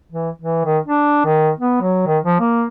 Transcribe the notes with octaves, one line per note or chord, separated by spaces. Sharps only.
E3
E3
D#3
D4
D#3
B3
F#3
D#3
F3
A#3